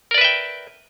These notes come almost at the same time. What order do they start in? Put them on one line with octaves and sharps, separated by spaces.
A#4 D5 B4 E5 G5